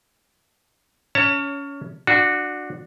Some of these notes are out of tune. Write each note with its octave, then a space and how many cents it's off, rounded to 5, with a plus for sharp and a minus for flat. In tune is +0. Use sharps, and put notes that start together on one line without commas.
C#4 +20 C#5 +10 A5 +40
D4 +15 F#4 -15